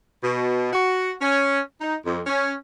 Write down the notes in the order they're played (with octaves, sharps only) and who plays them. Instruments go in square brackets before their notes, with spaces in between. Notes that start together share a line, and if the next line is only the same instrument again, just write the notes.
[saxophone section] B2
F#4
C#4
D#4
F2
C#4